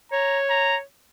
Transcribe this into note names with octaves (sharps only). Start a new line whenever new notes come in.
C#5 A#5
A#5